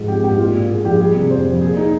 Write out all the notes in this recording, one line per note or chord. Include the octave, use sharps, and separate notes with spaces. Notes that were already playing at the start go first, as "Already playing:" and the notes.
Already playing: G#2 F3 G#4
C4 G4
G#2 G4
A#2 F4
A#2
A#2 G#4
A#1 G4
G3 G#4
C3
F2 C5
F2
A#2 G#4
D#4